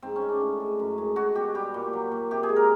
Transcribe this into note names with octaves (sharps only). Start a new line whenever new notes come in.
G#2 C4
C#4
G#3
D4
A2
G#3
F#2
G#3
G#3 F#4
B2 G4
G3 G4
A#2
F#3
A#2
C3 G4
G#4
G#3
A#4